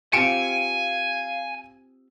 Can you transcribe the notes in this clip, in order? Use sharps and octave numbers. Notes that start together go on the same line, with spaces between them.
C4 F4 G4 F5 G#5 C#7 D7 E7